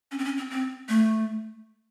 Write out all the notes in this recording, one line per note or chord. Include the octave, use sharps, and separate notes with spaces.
C#4
C4
C#4
C4
C4
A3